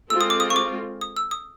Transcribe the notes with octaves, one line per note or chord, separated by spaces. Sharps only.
G#3 C4 F4 A4 E6
D#6
D6
D#6
C#6
D6
D#6
E6
D#6